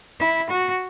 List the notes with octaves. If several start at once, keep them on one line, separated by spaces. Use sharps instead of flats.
E4
F#4